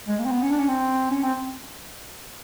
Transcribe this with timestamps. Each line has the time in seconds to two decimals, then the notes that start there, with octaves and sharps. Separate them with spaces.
0.08 G#3
0.19 A#3
0.25 C4
0.31 B3
0.42 C#4
0.51 D4
0.60 C#4
0.68 C4
1.11 C#4
1.23 C4